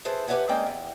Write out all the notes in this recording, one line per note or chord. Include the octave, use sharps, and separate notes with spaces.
E4 G#4 A4 B4 C5
G4 B4 D5 E5 F#5 G#5
G#3 A#3 C4 C#4 D5 G5
E2